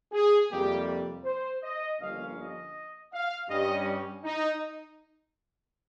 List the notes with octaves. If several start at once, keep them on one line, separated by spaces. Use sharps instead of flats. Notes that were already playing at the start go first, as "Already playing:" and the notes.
G#4
F2 C3 G3 A#3 G4
C5
D#5
G1 G2 F3 A#3 C#4 F5
D#5
F5
G2 G3 C#4 D#5
D#4